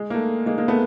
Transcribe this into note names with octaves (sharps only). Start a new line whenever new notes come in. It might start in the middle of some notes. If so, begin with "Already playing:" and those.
Already playing: G#3
A#3
A3
G#3 A#3
G#3 A#3
A3 B3